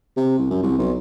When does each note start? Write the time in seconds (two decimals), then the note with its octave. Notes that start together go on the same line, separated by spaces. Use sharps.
0.16 C3
0.38 C2
0.50 F#2
0.63 C2
0.78 B1